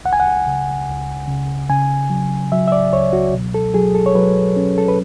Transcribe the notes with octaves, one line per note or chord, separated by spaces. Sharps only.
C#2 F#5
G#5
F#5
C#3
C#2
C#3
C#3 G#5
F#3
F#3 E5
E5
D5
C#2 C#5
F#4
B2
A4
F#3 G#4
A4
C#5
F#3 B4
C#4
A4
B4